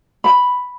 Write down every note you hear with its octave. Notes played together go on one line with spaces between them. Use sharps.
B5